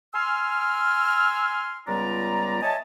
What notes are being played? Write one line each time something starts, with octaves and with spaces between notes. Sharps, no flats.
G#5 C6 E6 F6
C#2 G3 B3 F4 D5 A#5
C#5 D#5 E5 G#5 A5